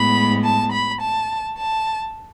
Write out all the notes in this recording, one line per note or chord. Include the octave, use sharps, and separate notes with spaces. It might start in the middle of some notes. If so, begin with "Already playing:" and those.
Already playing: A2 G#3 B3 B5
A5
B5
A5
A5